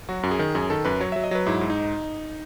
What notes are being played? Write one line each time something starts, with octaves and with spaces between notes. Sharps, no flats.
F#3 F#4
F#2
G#4
D#3
F#2 G#4
D#3 A4
F#2 B4
F#3 C#5
F#3 E5
D#5
F#3 B4
G#2 E4
G#2
D#4